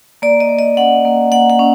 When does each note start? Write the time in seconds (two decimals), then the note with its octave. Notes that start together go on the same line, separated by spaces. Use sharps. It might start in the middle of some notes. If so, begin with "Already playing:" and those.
0.22 A#3 D5
0.40 D#5
0.49 A#3
0.59 D#5
0.77 C#4 F#5
1.05 A#3
1.32 A#3 F#5
1.50 F#5
1.59 C#4